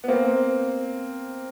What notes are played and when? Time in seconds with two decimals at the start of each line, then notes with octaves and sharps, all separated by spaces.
0.04 B3
0.08 A#3 C4